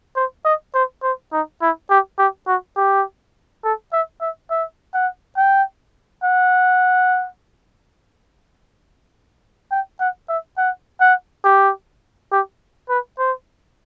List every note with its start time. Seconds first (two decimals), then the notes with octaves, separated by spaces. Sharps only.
0.16 C5
0.45 D#5
0.74 C5
1.03 C5
1.32 D#4
1.62 E4
1.90 G4
2.18 G4
2.47 F#4
2.76 G4
3.64 A4
3.93 E5
4.21 E5
4.50 E5
4.94 F#5
5.37 G5
6.23 F#5
9.71 G5
10.00 F#5
10.29 E5
10.57 F#5
11.01 F#5
11.44 G4
12.32 G4
12.89 B4
13.18 C5